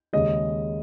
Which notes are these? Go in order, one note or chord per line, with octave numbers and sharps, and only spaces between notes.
D#2 C#3 G#3 D#5